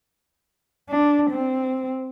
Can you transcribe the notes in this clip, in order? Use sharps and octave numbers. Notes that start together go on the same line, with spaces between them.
D4
C4